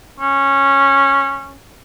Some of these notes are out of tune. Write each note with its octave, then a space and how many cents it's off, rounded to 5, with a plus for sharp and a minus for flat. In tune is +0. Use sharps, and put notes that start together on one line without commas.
C#4 -10